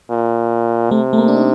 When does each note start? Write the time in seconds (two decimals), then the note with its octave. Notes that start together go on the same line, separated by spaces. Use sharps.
0.10 A#2
0.91 C3 A3
1.13 A3
1.18 A#3
1.28 D4
1.36 D#4